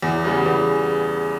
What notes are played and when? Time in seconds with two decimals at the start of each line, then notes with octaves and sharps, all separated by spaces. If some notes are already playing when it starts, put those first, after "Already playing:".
0.02 E2
0.24 C#3 G3 B3
0.46 E2